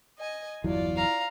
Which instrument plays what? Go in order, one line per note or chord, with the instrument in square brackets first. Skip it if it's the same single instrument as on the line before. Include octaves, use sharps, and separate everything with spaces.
[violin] D#5 G#5
[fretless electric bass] G1 E2 F#3 [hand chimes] E4 [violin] F4 D5
[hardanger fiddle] F5 A#5